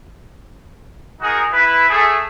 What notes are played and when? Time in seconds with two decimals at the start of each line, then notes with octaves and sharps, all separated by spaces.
1.21 D#4 F#4 G#4 A#4
1.52 E4 B4
1.89 A3 G#4